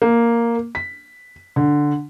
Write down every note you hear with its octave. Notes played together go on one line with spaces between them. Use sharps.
A#3
B6
D3